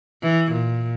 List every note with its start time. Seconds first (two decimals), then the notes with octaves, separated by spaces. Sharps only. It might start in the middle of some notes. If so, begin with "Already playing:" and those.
0.22 E3
0.52 A#2